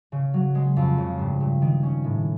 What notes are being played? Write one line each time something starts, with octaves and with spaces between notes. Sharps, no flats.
C#3
F#3
G#3
F2
C#3
G2
G2
D#3
C#4
A2